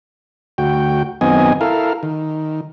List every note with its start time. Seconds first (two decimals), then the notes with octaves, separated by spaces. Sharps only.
0.58 D2 F#4 G5
1.21 F#2 D#3 B3 C4 D#5 G#5
1.61 E4 A4 A#4 F5
2.03 D#3